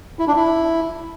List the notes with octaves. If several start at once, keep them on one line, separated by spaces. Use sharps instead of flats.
E4
D4
E4